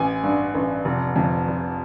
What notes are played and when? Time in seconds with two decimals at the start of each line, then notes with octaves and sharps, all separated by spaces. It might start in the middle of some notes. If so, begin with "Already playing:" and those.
Already playing: A1 G#5
0.23 G2
0.55 A1
0.85 F1
1.16 F2
1.48 F1